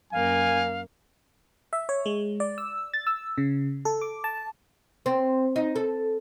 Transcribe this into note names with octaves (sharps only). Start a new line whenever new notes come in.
F#2 A#3 F5 G#5
E5
C#5
G#3
D5
E6
A6
E6
C#3
A4
D6
A5
C4
D#4
A4